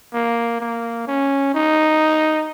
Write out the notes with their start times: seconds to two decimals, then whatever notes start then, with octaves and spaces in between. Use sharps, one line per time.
0.13 A#3
0.60 A#3
1.07 C#4
1.54 D#4